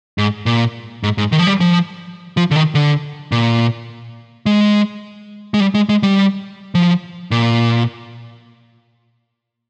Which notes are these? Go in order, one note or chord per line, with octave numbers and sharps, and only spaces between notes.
G#2
A#2
G#2
G#2
D#3
F3
G3
F3
F3
D3
D#3
D3
A#2
G#3
G#3
G3
G#3
G#3
G3
F3
A#2